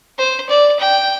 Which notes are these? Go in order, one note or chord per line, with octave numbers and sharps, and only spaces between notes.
C5
D5
G5